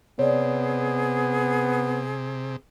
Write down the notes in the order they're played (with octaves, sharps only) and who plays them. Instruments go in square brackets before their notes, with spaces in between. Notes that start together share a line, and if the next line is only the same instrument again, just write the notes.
[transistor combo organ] C3 [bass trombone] B3 [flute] G#4 [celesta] C#5 D5